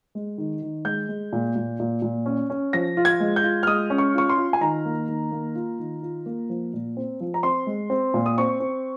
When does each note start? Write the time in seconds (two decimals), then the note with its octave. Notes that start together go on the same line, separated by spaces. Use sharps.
0.15 G#3
0.38 D#3
0.62 D#3
0.85 G#3 G6
1.09 G#3
1.33 A#2
1.55 A#2
1.80 A#2
2.02 A#2
2.26 C#4
2.50 C#4
2.73 F3 A#6
2.97 F4
3.05 G#6
3.20 G#3
3.36 G6
3.44 F4
3.63 F6
3.67 G#3 D#6
3.90 C#4
3.98 C#6
4.14 F4 C#6
4.29 C6
4.37 F4
4.53 G#5
4.61 D#3 A#5
4.85 A#3
5.08 D#3
5.31 A#3
5.55 F4
5.79 D#3
6.02 F4
6.26 A#3
6.49 F3
6.73 A#2
6.97 C4
7.20 F3
7.34 A#5
7.43 C4 C6
7.67 G#3
7.90 C4
8.14 A#2
8.26 D#6
8.38 C4 C#6
8.60 C4